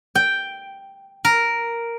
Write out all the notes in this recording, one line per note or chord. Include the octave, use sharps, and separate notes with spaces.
G5
A#4